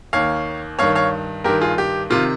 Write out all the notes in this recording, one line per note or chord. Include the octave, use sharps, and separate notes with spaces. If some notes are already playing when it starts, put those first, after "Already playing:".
D#2 D#3 C#5 F5
G2 D#3 C#5 F5
C#5 F5
G2 D#3 G4 A#4
F4 G#4
G4
C3 D#3 F4